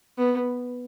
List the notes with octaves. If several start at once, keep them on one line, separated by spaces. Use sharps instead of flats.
B3